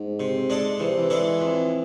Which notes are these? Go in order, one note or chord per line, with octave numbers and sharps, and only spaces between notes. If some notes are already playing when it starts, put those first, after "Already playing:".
Already playing: G#2
C3
G#3 D4 A4
C3 E3
E3
G#3 D4 A4
F2